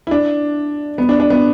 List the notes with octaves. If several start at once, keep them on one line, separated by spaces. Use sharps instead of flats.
E4
D4
B3
D4
D4
B3